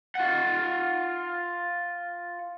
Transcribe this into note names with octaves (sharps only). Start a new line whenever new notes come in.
F4 F#5